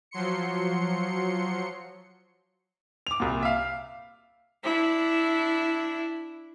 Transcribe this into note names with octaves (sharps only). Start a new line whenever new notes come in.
F3 F#3 C6 C#7
D6 F7
C2 A#2
E5 F5
D4 E4